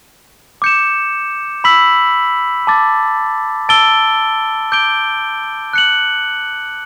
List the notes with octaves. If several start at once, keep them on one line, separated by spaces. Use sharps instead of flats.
D6 G6 C#7 E7
B5 E6 B6 F#7
A5 D6 A6
A5 E6 A6 D7 G7
D6 G6 D7 G7
F#6 C#7 F#7